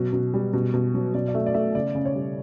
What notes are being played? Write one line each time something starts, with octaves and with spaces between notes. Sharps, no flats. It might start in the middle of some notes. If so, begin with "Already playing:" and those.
Already playing: B2 F#3
B2
G3
B2
B2
F#3
B2 D5
D5
A3 E5
D5
A3 E5
C#3 D5
C#3
C#5
G3